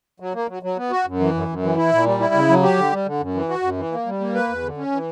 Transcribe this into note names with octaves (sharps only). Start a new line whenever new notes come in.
F#3
A#3
F#3
F#3
B3
F#4
F#2
E3
F#2
F#2
E3
E4
A#2
G3
E4
C#3
F#3
G4
D3
G3
D3
F#2
E3
F#4
F#2
E3
A#3
G3
A#3
B4
E2
D3
C#4
E3